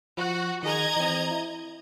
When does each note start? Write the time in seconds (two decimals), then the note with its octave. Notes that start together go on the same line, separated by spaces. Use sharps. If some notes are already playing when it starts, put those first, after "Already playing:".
0.17 F3 F#4 F#6
0.63 D#3 G#4 D#5 A#5 G#6
0.96 E3 C4
1.31 E4